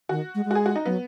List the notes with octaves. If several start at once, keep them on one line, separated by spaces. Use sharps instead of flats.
D#3 F#4
G#3
G#3
F#4
G#4
F#4
D#4
F#3 B3